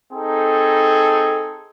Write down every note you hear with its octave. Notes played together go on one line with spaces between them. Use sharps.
C4 D#4 G#4 A4